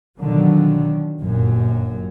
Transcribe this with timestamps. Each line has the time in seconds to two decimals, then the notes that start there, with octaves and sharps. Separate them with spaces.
0.20 B2 D3 D#3 F3 F#3
1.21 G1 F#2 A#2 F#3